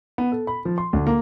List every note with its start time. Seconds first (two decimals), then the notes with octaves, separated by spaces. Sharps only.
0.18 B3
0.32 A4
0.47 B5
0.65 F3
0.78 C6
0.93 D2
1.07 A#3